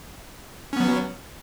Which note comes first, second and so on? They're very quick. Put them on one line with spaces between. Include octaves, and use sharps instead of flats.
C#4 B3 F#3